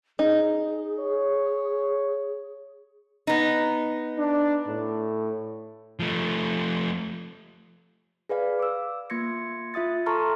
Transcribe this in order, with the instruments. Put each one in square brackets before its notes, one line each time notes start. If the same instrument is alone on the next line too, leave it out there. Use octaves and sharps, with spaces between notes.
[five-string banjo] D#4 [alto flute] G#4
[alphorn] C#5
[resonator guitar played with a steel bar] B3 D#4
[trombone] D4
A2
[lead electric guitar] F3 A3
[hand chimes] G#4 B4 D5 F5
D6 E6
A#3 F4 C6 G#6 A#6 C#7
F4 E5 D#6 A6
A4 A5 A#5 C6 C#6 F6